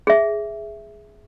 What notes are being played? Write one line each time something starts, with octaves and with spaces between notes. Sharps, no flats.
G#4 E5